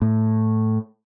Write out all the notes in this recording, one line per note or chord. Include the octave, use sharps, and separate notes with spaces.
A2